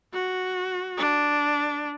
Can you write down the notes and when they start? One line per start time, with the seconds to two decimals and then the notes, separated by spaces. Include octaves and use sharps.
0.13 F#4
0.97 D4